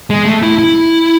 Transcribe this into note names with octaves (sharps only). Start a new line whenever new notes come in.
G#3
A3
E4
E4